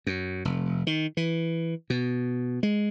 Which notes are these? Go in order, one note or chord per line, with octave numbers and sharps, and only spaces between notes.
F#2
F1
D#3
E3
B2
G#3